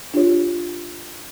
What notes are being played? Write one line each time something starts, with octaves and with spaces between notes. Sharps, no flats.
D4 F4 G4 C#5